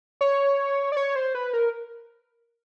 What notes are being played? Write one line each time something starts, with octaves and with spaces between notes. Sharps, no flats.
C#5
D5
C#5
C5
B4
A#4